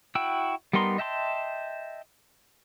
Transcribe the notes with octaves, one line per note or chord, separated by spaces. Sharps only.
E4 F#4 G5 E6
G3 B3 D#4 A#4 C6
D#5 E5 G5 A5 C6